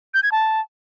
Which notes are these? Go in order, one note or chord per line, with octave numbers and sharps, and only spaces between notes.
G6
G#6
A5